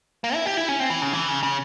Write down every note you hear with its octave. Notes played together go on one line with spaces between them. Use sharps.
A#3
E4
G4
E4
C#4
C4
E3
C#3
E3
C#3
C#3